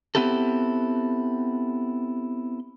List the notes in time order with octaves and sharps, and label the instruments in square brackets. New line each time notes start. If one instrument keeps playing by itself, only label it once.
[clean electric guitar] B3 C4 E4 G4 A4